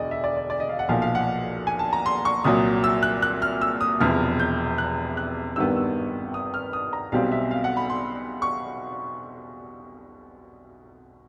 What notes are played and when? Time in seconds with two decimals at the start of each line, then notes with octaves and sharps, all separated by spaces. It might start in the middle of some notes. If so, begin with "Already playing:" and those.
Already playing: E1 D2 D5 D#5
0.11 E5
0.24 D5
0.37 D5
0.50 D5
0.60 D#5
0.69 F5
0.79 F#5
0.89 B1 A#2 F3 F5
1.02 F5
1.15 F#5
1.67 G#5
1.79 A5
1.93 A#5
2.06 C6
2.25 C#6
2.44 C2 A#2 F#3 D#6
2.84 E6
3.03 F#6
3.22 F#6
3.42 F6
3.61 E6
3.81 D#6
4.00 E1 E2 C3 F3 F6
4.39 G6
4.78 F#6
5.17 F#6
5.56 G#1 G2 D#3 G3 B3 E6
5.76 E6
6.34 D#6
6.54 F6
6.73 D#6
6.93 A#5
7.12 B1 B2 G3 C4 F5
7.32 E5
7.51 F5
7.64 F#5
7.77 B5
7.90 C6
8.42 C#6